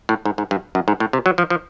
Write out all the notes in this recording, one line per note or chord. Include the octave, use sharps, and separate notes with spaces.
A2
G#2
G#2
G2
F#2
G#2
A2
C3
F#3
F3
F3